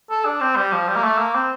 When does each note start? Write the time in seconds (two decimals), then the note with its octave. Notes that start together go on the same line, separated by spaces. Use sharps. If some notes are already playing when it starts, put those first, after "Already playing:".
0.11 A4
0.25 D4
0.41 C4
0.57 G3
0.72 F3
0.88 G3
0.96 A#3
1.04 A3
1.18 A#3
1.35 C4